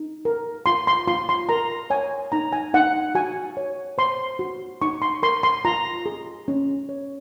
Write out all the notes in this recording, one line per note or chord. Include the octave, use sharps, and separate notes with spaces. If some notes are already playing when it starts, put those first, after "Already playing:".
Already playing: D#4
A#4
F4 C6
C6
F4 C6
C6
A#4 A#5
C#5 G#5
D#4 A#5
G#5
D#4 F#5
F#4 G#5
C#5
C5 C6
F#4
D#4 C#6
C6
A#4 C6
C6
F4 A#5
G#4
C#4
C#5